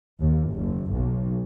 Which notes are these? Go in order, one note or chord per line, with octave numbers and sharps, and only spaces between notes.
D#2
F#1
B1